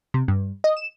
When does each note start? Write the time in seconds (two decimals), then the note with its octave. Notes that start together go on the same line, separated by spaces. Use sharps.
0.14 C3
0.28 G2
0.64 D#5
0.77 E7